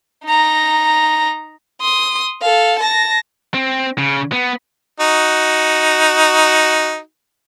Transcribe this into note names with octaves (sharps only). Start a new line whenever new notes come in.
D#4 A#5
C6 D#6
A4 F5
A5 A#6
C4
C#3
B3
D#4 F#4